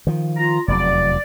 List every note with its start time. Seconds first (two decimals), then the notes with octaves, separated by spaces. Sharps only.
0.07 D#3 F3
0.37 F4 A#5
0.68 F1 E2 F#3 D5